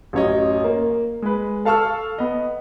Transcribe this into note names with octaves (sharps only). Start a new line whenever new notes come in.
A1 F#2 C#5 D#5
A#3
G#3 B4
A4 F5 A5 C#6 E6 F6
B3 D#5